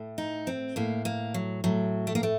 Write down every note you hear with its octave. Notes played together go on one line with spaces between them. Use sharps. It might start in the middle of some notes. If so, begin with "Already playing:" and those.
Already playing: A2
D#4
C4
A2 A#3
A#3
F#3
A2 F#3
A3
A#3
A3